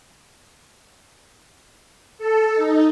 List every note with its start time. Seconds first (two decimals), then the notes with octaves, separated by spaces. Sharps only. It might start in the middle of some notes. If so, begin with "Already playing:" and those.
2.18 A4
2.55 D#4